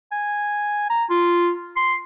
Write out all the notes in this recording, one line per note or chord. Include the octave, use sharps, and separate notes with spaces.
G#5
A#5
F4
C6